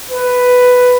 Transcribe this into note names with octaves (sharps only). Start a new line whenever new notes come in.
B4